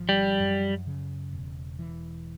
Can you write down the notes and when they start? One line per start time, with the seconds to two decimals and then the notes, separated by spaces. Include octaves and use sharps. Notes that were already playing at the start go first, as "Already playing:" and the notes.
Already playing: G#1 F3
0.09 G3
0.40 F#2
0.87 C#3
1.33 E1
1.79 E3